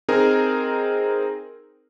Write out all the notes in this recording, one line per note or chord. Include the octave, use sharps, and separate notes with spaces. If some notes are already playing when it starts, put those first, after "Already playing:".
C4 D#4 G#4 A#4